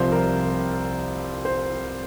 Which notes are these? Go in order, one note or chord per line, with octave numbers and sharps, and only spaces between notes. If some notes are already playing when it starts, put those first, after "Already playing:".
Already playing: C2 C3 F3 C5
A#4
C5